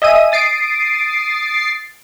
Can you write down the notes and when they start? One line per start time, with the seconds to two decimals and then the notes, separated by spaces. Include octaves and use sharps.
0.02 D#5 E5 G#5 D#7
0.32 D#6 A6 C7 D7